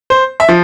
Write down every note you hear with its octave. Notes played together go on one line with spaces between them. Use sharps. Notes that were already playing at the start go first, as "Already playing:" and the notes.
C5
E5
F3